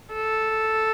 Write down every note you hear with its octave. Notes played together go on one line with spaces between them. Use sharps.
A4